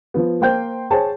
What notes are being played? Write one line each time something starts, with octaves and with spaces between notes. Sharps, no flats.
F3 B3
A#3 C5 G5 G6
G#4 C5 C#5 G5 A5